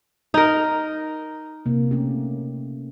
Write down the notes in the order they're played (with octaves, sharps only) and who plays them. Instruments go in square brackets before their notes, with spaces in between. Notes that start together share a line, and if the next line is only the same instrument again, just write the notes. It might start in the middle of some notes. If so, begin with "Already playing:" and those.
[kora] D#4 A#4
[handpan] C3 A#3
A3 C#4 G4